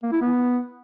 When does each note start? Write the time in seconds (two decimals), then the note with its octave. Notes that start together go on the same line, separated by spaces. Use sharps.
0.03 A#3
0.13 E4
0.22 B3